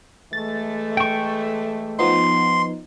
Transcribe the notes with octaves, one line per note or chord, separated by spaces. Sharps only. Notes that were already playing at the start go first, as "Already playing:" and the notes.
E3 G#3 A3 A6
G5 C#6
F3 B3 D#4 C6